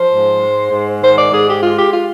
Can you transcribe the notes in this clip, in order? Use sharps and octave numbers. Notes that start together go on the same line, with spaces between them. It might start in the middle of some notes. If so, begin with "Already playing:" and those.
Already playing: F3 C5
G#2
G#3
G#2
D#3 C5
D5
G#2 G#4
G4
G#3 F4
G4
F4